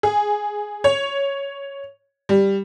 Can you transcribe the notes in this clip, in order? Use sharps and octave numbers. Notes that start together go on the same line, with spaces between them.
G#4
C#5
G3